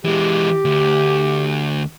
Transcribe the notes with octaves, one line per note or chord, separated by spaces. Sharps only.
E3 G#3 G4
D2